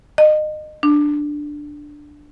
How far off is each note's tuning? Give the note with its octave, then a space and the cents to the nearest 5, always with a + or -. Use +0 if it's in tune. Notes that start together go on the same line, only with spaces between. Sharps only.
D#5 -25
D4 +5